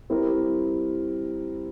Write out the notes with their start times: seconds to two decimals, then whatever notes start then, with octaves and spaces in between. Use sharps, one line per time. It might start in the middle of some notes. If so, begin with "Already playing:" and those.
0.10 G3 C4 E4 A#4